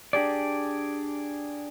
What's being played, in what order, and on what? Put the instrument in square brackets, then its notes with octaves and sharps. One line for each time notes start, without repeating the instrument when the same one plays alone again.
[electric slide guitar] D4 G4 G#4 D5